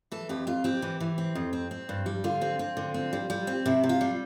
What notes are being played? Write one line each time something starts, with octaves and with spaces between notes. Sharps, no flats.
E3 A4
F2 G4
F2 F4
C4 G4
E3
E3
C4
F2
C4
C4
G2
G3
D3 F4
C4
C4
D3
C4
G3
G3
C4
C3 E4
C3
F4
G3